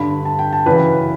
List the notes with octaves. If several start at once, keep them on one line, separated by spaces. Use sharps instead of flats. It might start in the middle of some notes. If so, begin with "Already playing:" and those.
Already playing: G2 D3 B5
A5
G5
A5
F#2 C#3 E3 B4